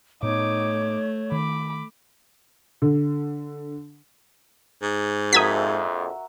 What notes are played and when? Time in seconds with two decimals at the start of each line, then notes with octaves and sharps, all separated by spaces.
0.23 A2 A3 B3 D#4 C#5 D6
1.32 D#3 B5 D6
2.82 D3
4.83 G#2
5.33 A#1 F2 F#4 A#4 E5 D#6 G#6 B6